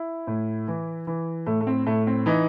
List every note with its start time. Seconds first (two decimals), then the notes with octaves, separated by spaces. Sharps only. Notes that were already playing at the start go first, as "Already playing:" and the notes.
Already playing: E4
0.27 A2
0.68 E3
1.07 E3
1.46 A2 A3
1.61 A3
1.67 C4
1.87 A2 A3
2.07 C4
2.26 E3 D#4